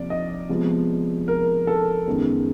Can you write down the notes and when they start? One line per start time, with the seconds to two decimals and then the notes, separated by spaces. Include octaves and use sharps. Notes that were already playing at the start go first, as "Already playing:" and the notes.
Already playing: C3 F3 A#3 D5
0.10 D#5
0.49 C3 F3 G#3 B3
1.28 A#4
1.67 A4
2.07 F#2 D#3 G#3 B3